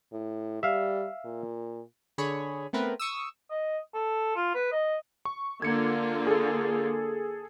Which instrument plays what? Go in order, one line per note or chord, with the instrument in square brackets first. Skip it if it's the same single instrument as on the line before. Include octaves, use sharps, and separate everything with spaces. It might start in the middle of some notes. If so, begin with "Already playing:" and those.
[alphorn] A2
[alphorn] G3 [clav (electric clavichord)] E5 F5
[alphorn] A#2
[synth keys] D3 G#4 C#5 B5
A3 B3 C4 A#4 B4
C#6 D#6 E6
[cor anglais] D#5
A4
F4
B4
D#5
[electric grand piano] C#6
[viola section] D3 A#3 F4 [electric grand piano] G#6 C#7
[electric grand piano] G#4 A4